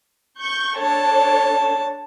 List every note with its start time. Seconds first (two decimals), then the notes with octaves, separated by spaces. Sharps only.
0.39 C#6 G6
0.78 D4 A4 C#5 A5